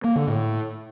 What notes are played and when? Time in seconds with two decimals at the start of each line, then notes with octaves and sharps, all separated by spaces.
0.04 A#3
0.16 D3
0.27 A2